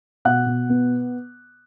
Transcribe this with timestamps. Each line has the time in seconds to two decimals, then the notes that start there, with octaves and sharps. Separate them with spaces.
0.25 B2 F#5 F#6
0.46 B2
0.70 B3